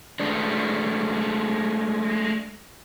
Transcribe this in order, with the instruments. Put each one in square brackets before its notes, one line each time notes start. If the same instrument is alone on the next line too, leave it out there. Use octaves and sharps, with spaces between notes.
[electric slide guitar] G#3 A3 D4